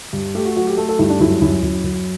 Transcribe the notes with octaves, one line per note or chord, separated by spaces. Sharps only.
G2
A3 G4
F#4
F#3 F#4
G4
A3 A4
A4
G2 E4
D4
F#2 E4
F#2 E4
F#2
F#2